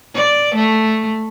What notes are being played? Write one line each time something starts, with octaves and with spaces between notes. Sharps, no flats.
D5
A3